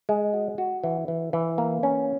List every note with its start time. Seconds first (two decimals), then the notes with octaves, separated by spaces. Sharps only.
0.09 G#3
0.34 F#4
0.58 F#4
0.84 E3
1.08 E3
1.33 E3
1.58 A#3
1.83 C#4